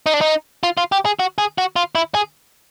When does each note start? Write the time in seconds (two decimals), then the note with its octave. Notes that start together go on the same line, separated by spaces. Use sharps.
0.06 D#4
0.14 D4
0.21 D#4
0.63 F4
0.77 F4
0.92 G4
1.05 G#4
1.19 F#4
1.38 G#4
1.58 F#4
1.76 F4
1.95 E4
2.15 G#4